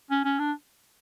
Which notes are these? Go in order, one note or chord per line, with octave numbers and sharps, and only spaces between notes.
C#4
C#4
D4